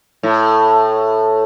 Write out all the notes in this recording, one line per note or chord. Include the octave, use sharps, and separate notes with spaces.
A2